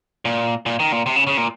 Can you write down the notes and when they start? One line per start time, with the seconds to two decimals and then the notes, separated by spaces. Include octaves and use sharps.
0.25 A#2
0.66 A#2
0.80 D#3
0.92 A#2
1.06 C3
1.16 C#3
1.27 C#3
1.37 A#2